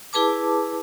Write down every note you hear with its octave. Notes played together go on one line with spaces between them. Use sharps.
E4 G#4 B4 A5 D6